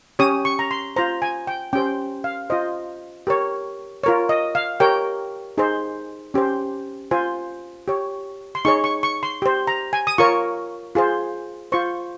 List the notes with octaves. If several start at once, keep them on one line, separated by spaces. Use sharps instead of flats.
C#4 G4 C#5 D#6
C#6
A#5
C6
F4 C5 A#5
G#5
G5
C#4 G4 C5 G5
F5
F4 C5 D#5
G4 A#4 C#5
F4 A#4 C#5
D#5
F5
G4 A#4 C#5 G5
D#4 G#4 C5
C#4 G4 C5
F4 C5 G#5
G4 C#5
C6
D#4 G#4 C#5 C#6
C#6
C#6
C6
G4 C5
A#5
G#5
D#6
F4 A#4 C#5 C#6
F4 G#4 C5
F4 C5 C#6